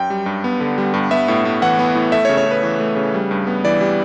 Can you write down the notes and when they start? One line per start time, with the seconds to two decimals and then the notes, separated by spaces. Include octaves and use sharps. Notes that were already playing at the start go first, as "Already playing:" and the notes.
Already playing: F#2 G5
0.10 G3
0.26 G2
0.44 B3
0.60 D3
0.78 G3
0.94 G2
1.11 B3 E5
1.28 A2
1.45 A2
1.62 E3 F#5
1.79 B3
1.95 A2
2.12 A3 E5
2.25 C#5
2.29 C#3
2.37 C#5
2.46 C#3
2.51 B4
2.63 E3
2.80 A3
2.96 C#3
3.14 G3
3.31 G2
3.47 B3
3.65 E3 D5
3.81 G3